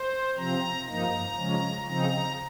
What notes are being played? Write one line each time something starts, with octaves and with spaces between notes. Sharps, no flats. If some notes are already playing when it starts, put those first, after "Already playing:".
Already playing: C5
C3 F3 C4 A#5
G2 F3 A#3 D#4 A#5
C#3 F3 G#3 C#4
C#3 F3 C4 D#4 A#5